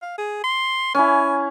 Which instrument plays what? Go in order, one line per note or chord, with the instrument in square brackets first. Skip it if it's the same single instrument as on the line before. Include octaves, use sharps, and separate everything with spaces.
[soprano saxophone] F5
G#4
C6
[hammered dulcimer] C#4 E4 [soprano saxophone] G#5